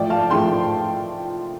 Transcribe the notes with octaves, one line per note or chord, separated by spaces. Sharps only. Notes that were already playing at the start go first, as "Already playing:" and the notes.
Already playing: A2 F3 A3 D5 G5
F5 A5
A2 F3 A3 G5 C6